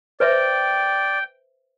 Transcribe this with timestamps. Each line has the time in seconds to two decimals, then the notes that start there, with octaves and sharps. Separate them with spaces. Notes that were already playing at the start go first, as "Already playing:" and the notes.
0.20 B4 C5 D5 E5 G5